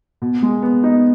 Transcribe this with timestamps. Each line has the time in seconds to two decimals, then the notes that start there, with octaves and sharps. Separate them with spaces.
0.22 B2
0.42 G#3
0.63 B3
0.83 D#4